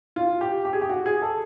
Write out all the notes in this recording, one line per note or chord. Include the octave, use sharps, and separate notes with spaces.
F4
G4
G4
G#4
G4
F#4
G#4
A4